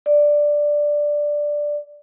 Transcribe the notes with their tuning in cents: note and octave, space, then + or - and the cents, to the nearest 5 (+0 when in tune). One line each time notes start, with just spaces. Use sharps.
D5 +5